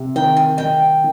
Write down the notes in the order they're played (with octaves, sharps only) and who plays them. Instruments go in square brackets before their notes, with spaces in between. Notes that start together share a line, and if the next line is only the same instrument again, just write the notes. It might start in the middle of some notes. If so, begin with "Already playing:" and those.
Already playing: [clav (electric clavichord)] C3
[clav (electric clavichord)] D#3 [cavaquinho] G5
[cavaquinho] G#5
[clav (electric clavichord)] D#5 [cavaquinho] G5